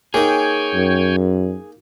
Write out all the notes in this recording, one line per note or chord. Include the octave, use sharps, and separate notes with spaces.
A#3 D#4 G#4 C#5 G5 G#5
F#2